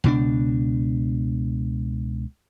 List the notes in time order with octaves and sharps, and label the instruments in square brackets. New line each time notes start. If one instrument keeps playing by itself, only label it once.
[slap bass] C#2 B2 C#4 D4